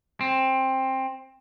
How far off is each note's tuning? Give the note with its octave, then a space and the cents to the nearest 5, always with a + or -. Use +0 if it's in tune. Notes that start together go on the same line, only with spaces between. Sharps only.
C4 +15